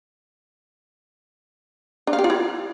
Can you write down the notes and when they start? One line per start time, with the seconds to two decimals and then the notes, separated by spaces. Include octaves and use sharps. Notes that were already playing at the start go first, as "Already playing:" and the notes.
2.07 D4
2.13 F5
2.19 G4
2.24 F4
2.30 E4